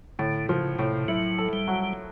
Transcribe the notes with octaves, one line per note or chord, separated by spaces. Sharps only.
A2 D3
C#3 F3
A2 C3
F#3 E4
A4
G3
F#3